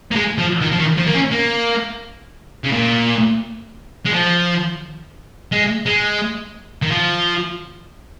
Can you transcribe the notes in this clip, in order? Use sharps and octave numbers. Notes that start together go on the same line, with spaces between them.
A#3
G#3
F3
D#3
F3
D#3
F3
A#3
C#4
A#3
C#3
A#2
G#3
F3
G#3
G#3
D#3
F3